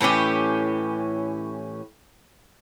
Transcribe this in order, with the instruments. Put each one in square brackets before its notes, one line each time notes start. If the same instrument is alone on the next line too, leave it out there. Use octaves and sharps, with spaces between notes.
[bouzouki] A2 E3 C#4 G4